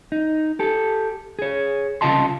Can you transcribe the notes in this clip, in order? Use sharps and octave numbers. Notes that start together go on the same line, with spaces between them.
D#4
G4 A4
G#4 C#5
C2 C#3 F4 D#5 A5 C6